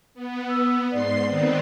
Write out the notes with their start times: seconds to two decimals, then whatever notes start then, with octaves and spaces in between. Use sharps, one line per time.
0.14 B3
0.50 E6
0.92 G#2 D5 C6 C7
1.26 D#3 B3 C4